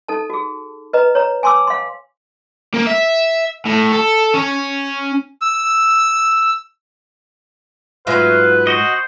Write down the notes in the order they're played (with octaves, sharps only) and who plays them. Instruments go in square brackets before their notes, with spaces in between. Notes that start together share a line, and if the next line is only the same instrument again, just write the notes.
[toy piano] D#4 A4 A5
F#4 G#4
B4 D#5 A#5
C#5 A#5
G#5 A5 C6 D6 E6
F5 C6
[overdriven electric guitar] A#3
E5
A2
A4
C#4
[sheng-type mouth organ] E6
[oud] G#2 F#3 F4 [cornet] B4 [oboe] F5
[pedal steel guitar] F#4 D#5 [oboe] C5